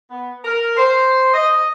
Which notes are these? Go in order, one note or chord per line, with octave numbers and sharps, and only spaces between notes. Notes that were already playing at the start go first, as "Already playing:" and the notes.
B3
A#4
C5
D#5